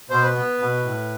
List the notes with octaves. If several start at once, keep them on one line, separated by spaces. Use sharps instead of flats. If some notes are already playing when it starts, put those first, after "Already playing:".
B2 C5
B4
B3
B2
A2